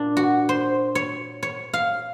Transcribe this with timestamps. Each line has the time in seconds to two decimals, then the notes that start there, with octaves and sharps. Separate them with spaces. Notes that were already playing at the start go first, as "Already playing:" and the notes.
Already playing: A#2 D4
0.17 F#4
0.49 C5
0.95 C#5
1.43 C#5
1.74 F5